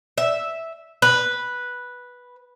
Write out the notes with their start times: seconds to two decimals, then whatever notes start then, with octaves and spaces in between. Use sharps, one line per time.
0.18 E5
1.02 B4